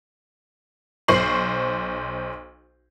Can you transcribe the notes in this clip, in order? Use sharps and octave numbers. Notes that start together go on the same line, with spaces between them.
B1 C5 C#6 C7 F#7